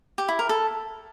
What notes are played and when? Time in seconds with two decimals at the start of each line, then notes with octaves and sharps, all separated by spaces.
0.18 G4
0.28 E4
0.39 A#4
0.49 A4